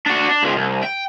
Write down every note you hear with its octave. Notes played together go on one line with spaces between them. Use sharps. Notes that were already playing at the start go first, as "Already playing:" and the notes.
D4 F#4
D4
C#2 F3
C2
G5